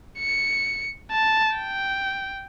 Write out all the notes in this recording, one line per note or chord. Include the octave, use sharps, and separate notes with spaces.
C#7
A5
G5